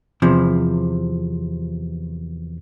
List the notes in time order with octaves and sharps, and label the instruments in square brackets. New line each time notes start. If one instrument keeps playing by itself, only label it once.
[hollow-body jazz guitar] E2 C3 F3